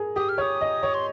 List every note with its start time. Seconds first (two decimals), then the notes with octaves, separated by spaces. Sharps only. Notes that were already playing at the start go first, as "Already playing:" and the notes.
Already playing: G#4 A#4
0.16 G4 D#6
0.29 F6
0.38 C#5 D#6
0.61 D#5
0.83 C#5
0.94 C6